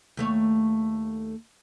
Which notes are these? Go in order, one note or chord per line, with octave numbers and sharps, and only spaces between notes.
D#2 A3 C#5